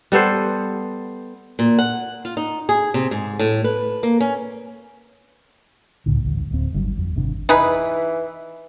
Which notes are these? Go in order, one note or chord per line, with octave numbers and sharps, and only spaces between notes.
G3 B3 A4 C5
A#2
F#5
F4
D#4
G#4
C3
G#2
A2
B4
A#3
C#4
C#2 A2 D3
A1 D2 G2
D1 C4
G1 G2 E3 F#3
F2
G#1 F2 C3 D4
E3 D#4 G#4 B4